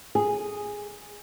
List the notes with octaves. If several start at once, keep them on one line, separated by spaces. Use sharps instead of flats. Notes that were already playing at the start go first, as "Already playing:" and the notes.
G#4